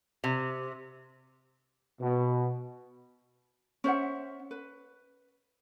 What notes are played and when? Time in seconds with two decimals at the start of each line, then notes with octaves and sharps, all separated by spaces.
0.24 C3
2.01 B2
3.84 C#4 C5 E5 F#5
4.51 B4